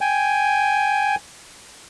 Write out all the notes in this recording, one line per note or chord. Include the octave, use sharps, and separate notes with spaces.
G5 G#5